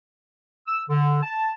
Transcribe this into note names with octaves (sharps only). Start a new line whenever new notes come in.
E6
D3
A5